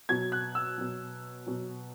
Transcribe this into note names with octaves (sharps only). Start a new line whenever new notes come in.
B2 F#3 G#6
F#6
E6
B2 F#3
B2 F#3